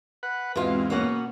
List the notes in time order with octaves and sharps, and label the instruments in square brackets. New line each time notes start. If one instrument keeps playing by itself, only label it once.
[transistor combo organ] B4 F#5
[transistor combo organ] E2 G#2 [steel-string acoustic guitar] B2 F4 [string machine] G#3 C4 F5
[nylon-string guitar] B2 A#3 C#4 [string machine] B3 [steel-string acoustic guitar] C#5 F#5